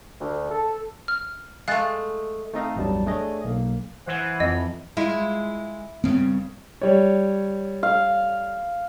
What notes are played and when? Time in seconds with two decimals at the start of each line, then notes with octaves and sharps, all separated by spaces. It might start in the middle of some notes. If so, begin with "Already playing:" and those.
0.21 D2
0.51 A4
1.08 F6
1.68 G#3 A3 F5 F#6 A6
2.54 A3 C4 D#4 A4 D#5 F5
2.76 A1 E2 G2 F#3 G3 A5
3.06 A3 D4 G#4 C#5 D#5
3.44 B1 A#3
4.08 E3 C5 F#5 G#5
4.40 F2 C4 D#5
4.97 G#3 E4 F4
6.04 G2 C#3 B3 C4
6.82 G3 C#5
7.83 F5